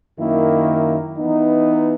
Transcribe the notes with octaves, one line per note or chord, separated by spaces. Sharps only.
F#2 D#3 A#3 E4
E3 B3 D#4